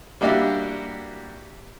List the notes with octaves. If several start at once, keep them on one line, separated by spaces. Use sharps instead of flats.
G3 A#3 D4 E4 F#4 G4